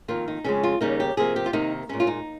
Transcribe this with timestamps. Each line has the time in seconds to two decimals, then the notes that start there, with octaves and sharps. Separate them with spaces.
0.08 F2 D#3 A#3 F4
0.28 D#4
0.44 F2 C#3 G#3 C#4
0.63 F4
0.81 D#2 C#3 G3 A#3 D#4
1.00 G4
1.17 C3 F3 A#3 G#4
1.36 G4
1.46 F4
1.53 C3 D#3 A#3 D#4
1.89 A#2 G#3 C#4
2.00 F4
2.07 D#4